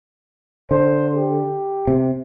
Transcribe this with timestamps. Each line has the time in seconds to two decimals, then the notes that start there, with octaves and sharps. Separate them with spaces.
0.71 D3 C5
1.14 G4
1.87 C3